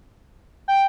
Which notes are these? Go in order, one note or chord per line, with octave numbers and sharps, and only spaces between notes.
G5